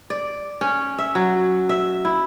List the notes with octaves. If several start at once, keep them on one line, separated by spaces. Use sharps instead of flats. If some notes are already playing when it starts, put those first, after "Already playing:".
D5
C#4
E5
F#3
E5
E4